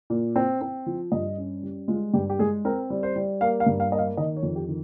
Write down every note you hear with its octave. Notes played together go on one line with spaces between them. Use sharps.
A#2
C4
C4
F3
G2 D#5
C#4
G3
G#3 F4
G2 G4
G4
G#3 G#4
C4 A#4
G3
C5
G3
A#3 F5
F5
G2
F5
A#3 D#5
F5
D#3 D#5
C#5
F2
G4
D#3